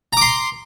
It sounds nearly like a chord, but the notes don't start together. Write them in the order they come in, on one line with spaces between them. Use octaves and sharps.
A#5 D6 C6